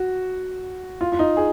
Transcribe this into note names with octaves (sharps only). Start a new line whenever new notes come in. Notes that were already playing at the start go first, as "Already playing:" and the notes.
Already playing: F#4
F4
F4
D#4
G#4